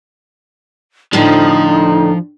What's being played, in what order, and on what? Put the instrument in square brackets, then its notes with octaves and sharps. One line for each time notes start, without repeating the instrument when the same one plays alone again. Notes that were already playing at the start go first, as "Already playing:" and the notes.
[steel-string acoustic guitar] A2 D3 [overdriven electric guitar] F3 [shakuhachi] D#4